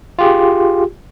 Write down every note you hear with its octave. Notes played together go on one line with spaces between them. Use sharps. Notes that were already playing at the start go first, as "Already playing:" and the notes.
F4 G4 G#4